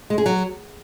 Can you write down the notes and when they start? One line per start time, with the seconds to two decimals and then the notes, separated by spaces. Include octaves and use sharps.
0.10 G#3
0.18 G#4
0.26 F#3